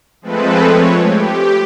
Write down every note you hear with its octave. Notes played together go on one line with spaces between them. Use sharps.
F3 G#3 A3 C4 A4 B4
C#5
G4